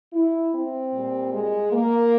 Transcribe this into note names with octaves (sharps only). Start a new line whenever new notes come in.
E4
C4
A#2 G3
G#3
A#3